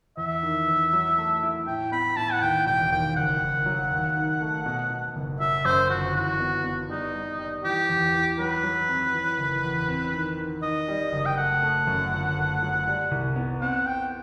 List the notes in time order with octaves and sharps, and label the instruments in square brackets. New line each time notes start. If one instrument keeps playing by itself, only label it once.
[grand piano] E2 [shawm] E5
[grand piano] D#3
E2
F#3
A3
E4
[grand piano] A2 [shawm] G5
[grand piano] B3 [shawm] B5
[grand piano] A2 [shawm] A5
[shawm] F#5
[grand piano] D#2 [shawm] G5
[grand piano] E1 [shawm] G5
[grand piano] D#2 [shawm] G5
[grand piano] F#1 [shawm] F#5
[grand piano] F#1
F#3
D#2
D#3
A3
B2
B2
F#1
[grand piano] F#3 [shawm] E5
[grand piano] F#2 [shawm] C5
[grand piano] G1 [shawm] F#4
[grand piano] E3 [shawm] F#4
[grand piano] B3
B3
[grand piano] G3 [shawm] D#4
[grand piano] G3
G3
[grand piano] E3 [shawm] G4
[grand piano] E2
E3
[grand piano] F#3 [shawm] B4
[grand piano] F#3
C4
E3
F#1
E2
C4
D#3
D#3
[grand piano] D#3 [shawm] D#5
[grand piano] G3
F#1
[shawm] G5
[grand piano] A3 [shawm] F#5
[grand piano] A3
F#2
G1
A3
F#3
G3
C2
B3
[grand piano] C4 [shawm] F#5
[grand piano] C4 [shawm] G5